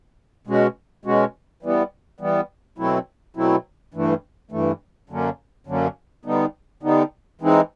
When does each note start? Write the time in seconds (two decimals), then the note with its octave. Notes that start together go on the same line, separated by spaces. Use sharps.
0.47 B2 G#3 C#4 F#4
1.05 B2 G#3 C#4 F#4
1.63 E3 G3 B3
2.20 E3 G3 B3
2.78 B2 F#3 A3 C4 E4
3.36 B2 F#3 A3 C4 E4
3.94 G2 E3 A3
4.51 G2 E3 A3
5.09 F#2 D3 F#3 A#3 C#4
5.67 F#2 D3 F#3 A#3 C#4
6.25 D3 G3 B3 D#4
6.83 D3 G3 B3 D#4
7.41 E3 G#3 C4 D#4